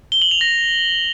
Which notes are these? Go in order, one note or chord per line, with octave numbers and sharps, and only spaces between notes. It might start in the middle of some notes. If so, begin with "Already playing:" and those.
G7
F#7
F7
A#6